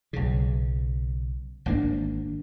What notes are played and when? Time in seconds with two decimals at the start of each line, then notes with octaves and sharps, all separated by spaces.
0.13 B1 C#3
1.66 G#1 A#3 D4